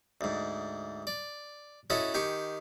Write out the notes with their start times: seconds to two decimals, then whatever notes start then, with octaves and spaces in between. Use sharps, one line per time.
0.21 D2 G#2
1.07 D5
1.90 C#4 E4 F#4 A4 D#5
2.14 D#3 G4 G#5 C#6